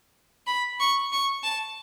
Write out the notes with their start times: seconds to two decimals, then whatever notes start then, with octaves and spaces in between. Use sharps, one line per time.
0.47 B5
0.80 C#6
1.12 C#6
1.44 A5